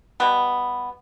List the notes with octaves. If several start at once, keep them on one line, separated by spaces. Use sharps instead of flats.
B2 G3 B3